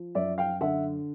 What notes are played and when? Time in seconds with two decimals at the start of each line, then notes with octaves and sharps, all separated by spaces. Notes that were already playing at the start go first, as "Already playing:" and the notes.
Already playing: F3
0.15 F#2 D5 E5
0.38 F5 G5
0.61 D3 E5 F#5